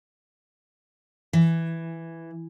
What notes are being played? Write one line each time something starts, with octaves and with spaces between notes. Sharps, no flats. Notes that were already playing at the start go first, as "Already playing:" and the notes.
E3